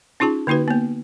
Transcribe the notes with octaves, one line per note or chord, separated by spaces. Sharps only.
C#4 D#4 F4 G#4 A5
D3 A#3 D#4 F#4 B4
A#3 B3